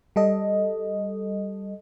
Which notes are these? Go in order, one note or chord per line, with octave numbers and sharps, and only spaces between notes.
G3 A4 D#5